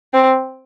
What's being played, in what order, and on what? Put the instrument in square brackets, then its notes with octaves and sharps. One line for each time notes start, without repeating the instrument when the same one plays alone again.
[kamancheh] C4